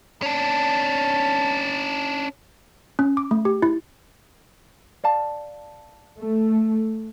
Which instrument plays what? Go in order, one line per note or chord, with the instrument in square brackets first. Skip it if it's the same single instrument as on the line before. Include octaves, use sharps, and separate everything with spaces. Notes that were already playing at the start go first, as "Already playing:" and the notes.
[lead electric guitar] C#4 D4 [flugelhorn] A5
[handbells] C#4
D6
A3
G4
E4
[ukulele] D5 F5 A5
[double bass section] A3